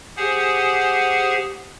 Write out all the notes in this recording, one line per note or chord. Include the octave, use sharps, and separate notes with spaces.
G4 G#4 C5 F#5 G#5